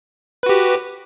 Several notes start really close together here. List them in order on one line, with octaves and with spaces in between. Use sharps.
B4 F#4 G4